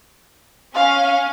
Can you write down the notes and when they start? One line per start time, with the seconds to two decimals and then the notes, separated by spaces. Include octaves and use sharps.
0.74 C#4 F5